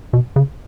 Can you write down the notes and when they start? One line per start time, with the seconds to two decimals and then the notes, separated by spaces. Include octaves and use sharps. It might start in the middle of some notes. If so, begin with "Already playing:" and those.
0.13 B2
0.36 C#3